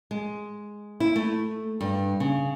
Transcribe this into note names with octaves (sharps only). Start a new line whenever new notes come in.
G#3
E4
A3
G2
C#3